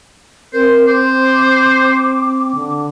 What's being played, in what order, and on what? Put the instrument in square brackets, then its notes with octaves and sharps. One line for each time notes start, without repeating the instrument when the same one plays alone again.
[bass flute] C4 [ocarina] A#4 [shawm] C5
[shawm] C5 [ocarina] D6
[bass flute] D3